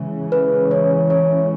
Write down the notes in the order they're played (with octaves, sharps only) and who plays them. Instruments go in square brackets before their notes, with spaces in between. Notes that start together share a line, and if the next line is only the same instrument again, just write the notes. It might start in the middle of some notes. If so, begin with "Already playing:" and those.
Already playing: [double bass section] C#3 E3 G#3 C#4
[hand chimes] B4
C#5
C#5